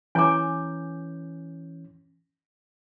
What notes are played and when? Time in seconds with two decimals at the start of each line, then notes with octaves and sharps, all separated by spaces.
0.15 E3 C#4 G#5 A#5 D6 G6